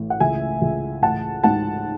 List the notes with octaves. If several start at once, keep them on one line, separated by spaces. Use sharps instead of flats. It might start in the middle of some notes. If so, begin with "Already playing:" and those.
Already playing: A1
F#5
C#2 E5 G#5
C#2
A1 F#5 A5
G#2 F#5 A5